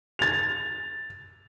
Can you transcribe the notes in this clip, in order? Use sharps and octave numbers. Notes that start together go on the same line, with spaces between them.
A6 F7